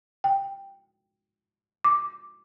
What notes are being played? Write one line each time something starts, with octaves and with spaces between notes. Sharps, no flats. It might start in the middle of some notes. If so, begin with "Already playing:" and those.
G5
D6